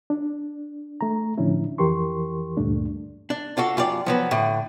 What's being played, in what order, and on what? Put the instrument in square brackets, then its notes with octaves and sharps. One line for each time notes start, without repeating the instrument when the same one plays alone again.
[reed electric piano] D4
A3 A#5
A2 D3 F3 C#4 D4 E4
F2 E3 G4 A#4 C6 C#6
D2 G2 A#2 A3 D4
[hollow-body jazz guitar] D4
D4 F4 F#4 A4
F#2 F4 G4 D5
F3 F#3 B3
A2 D3